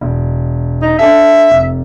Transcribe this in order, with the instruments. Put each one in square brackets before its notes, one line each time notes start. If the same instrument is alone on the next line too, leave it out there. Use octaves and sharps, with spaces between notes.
[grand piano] E1
[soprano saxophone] D#4
[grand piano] D4 A4 [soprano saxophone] E5
[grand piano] F1